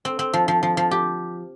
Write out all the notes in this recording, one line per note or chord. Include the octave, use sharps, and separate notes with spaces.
C4
C4
F3
F3
F3
F3
G4